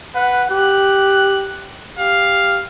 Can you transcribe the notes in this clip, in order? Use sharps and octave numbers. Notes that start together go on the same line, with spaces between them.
B4 F#5
G4 F#6
G4 F5